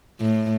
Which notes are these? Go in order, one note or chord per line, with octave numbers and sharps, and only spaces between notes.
A2